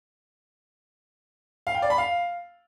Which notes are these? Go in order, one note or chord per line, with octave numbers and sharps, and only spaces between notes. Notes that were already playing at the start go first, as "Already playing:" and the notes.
F5
G5
D5
B5
F5